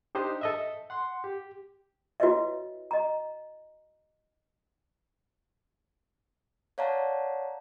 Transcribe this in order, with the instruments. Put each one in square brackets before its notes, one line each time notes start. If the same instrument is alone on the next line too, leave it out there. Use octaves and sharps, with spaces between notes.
[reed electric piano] D4 D#4 G4 C5 D#5
A4 D#5 E5
F#5 C6
G4
[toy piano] E4 F#4 B4 C#5 D#5 E5
D#5 A#5
[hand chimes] C#5 D5 F5 F#5 A5 A#5